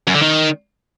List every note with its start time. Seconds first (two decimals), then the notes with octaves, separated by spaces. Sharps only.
0.07 F#2
0.15 D3
0.22 D#3